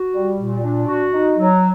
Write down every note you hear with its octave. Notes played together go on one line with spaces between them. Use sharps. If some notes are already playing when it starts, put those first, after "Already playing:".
Already playing: F#4
G3
A#2
D4
F#4
D#4
F#3